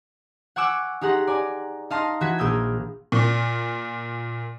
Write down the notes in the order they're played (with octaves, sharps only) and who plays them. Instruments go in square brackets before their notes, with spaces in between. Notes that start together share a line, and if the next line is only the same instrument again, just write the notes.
[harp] F#5 G#5 C#6 D6 E6 F#6
D#4 G4 G#4 F#5 A#5 C6
D5 G#5 A#5
D#4 D#5 F5 A5 A#5 C6
E3 F#4 G#6 B6
A#1 A#3 D#6 E6 G6 G#6
[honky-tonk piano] A#2